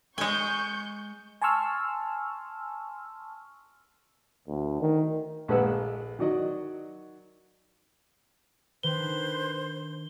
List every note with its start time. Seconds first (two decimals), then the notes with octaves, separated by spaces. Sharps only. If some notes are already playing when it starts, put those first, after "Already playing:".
0.18 G#3 G#5 C#6 G6
1.42 G#5 A5 C6 C#6 E6 F6
4.48 D2
4.81 D#3
5.48 A#1 G#3 A3 B4 F#5 E6
6.19 D#3 F#3 F#4 D5 D#5
8.83 D#3 D4 B4 C5 G7